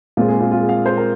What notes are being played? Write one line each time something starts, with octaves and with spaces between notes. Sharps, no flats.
A#2 G#3 C4 F4
G#4
F4
F4
G#4
F5
C5
A#4